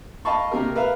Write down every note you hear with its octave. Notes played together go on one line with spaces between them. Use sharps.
D#5 F5 G5 A5 B5 C#6
C3 A#3 G4 A#4
A#4 B4 E5 F5